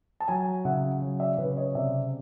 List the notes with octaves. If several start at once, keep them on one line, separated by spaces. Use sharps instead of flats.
A5
F#3 G#5 A#5
C#3 E5 F#5
F#3
D5 E5
C#3 B4 C#5
C#5 D#5
C3 D5 E5